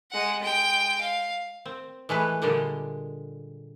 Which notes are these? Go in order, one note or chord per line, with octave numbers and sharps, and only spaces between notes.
G#3 F#5
G#3 G5
F5
C4
E3 G#3 A3 B4
A#2 D3 G3 G#3